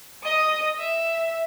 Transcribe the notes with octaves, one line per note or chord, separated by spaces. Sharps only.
D#5 D#6
E5